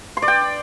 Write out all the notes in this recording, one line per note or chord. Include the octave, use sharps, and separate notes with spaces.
C6
D5
G5